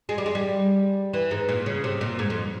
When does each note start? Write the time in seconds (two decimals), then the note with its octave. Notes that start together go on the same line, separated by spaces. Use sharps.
0.09 G#3
0.18 G3
0.26 G#3
0.35 G3
1.13 E3
1.31 G#2
1.49 A#2
1.66 C#3
1.84 C3
2.01 A#2
2.19 G#2
2.30 F2